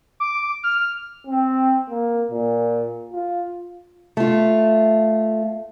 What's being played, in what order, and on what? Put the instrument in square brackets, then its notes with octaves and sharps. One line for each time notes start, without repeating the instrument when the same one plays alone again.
[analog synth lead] D6
F6
[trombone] C4
A#3
A#2
F4
[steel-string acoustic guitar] A3 F4